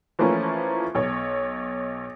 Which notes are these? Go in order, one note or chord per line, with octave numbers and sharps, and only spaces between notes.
E3 F3 A3 A#3 C#4 E4
B1 C#5